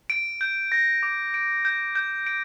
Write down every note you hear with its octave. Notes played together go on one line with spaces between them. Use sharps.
D7
G6
A#6
D6
D7
G6
G6
D7